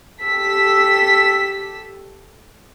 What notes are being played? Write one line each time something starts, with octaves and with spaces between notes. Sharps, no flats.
G4 A4 E6 B6